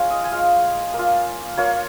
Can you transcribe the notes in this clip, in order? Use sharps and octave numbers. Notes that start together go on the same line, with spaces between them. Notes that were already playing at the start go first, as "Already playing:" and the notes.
Already playing: G#3 F4 C#5 F5
D#5
G#5
G#3 F4 F5
A#3
F4
A#3 F4 C#5